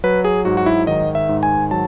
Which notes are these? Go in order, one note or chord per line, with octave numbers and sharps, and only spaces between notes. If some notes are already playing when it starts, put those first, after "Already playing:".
F#3 B4
G#4
G#2 F#4
F#4
E4
D#3 D#5
E5
G#2
G#5
F#3 A5